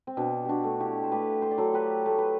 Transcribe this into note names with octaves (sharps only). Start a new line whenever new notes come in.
C4
B2 D4
D4 F#4 G4
A3
E4 G4
C5
A3 G4 B4
C5
D5
F#3 A4 C5
G4 B4
A3 C5
B4